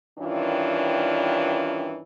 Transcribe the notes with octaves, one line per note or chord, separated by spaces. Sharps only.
G2 D#3 E3 C#4 D4 F4